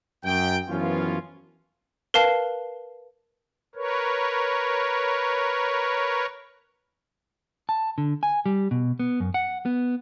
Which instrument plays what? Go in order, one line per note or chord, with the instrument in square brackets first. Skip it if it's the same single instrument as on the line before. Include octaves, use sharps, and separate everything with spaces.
[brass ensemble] F#2 G5
F#2 E3 F3 B3 C#4 F4
[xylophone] A#4 B4 F5 A5 C7
[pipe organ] A#4 B4 C#5
[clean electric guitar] A5
D3
G#5
G3
B2
B3
F#2
F#5
B3